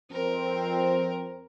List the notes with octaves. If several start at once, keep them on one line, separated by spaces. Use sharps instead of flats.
F2 C4 A#4